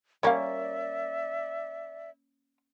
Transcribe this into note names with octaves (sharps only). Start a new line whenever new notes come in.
G3 A#3 C#4 C#5 D5 E5 F5